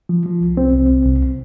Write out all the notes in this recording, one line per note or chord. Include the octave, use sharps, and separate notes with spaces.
F3
F3
C2
C2 C4
C2
C2
C2